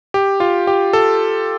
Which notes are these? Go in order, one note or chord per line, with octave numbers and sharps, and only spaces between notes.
G4
F4
G4
A4